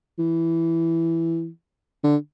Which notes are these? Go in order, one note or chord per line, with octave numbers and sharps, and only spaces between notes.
E3
D3